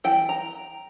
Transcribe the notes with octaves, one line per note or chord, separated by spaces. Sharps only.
E3 G5
A#5